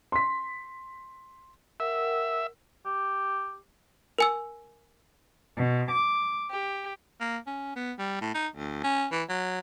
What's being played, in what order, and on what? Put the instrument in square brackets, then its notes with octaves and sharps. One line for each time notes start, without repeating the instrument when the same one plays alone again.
[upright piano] C6 B6
[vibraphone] A#4 F#5 G5 [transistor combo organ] E5
[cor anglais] G4
[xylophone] A#4 G#5 E6
[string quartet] B2
D6
G4
[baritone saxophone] A#3
C#4
B3
G3
A2
D#4
D2
C#4
E3
F#3